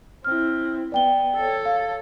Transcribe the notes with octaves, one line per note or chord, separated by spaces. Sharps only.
C4 E4 F6
B3 D5 G5 G7
A4 C#5
F5